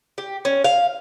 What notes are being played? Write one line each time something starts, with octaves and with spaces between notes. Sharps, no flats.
G4
C#4
F5